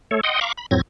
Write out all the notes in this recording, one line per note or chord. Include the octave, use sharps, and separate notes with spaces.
A3 A4 C#5
D#5 F#5 G5 C6 D#6
F5 A#5 B5 C#6 D6
B5
F2 A2 F#3 C4 G#6 A#6